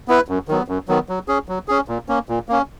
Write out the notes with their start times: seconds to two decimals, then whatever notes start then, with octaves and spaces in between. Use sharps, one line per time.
0.08 B3 E4 B4
0.28 F#2
0.48 D#3 F#3 B3
0.68 F#2
0.88 D#3 F#3 B3
1.09 F#3
1.28 C#4 G#4
1.49 F#3
1.68 C#4 G#4
1.88 A#2
2.09 A#3 C#4
2.29 A#2
2.49 A#3 C#4